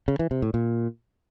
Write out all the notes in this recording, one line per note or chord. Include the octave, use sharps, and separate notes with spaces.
C#3
E3
C3
A2
A#2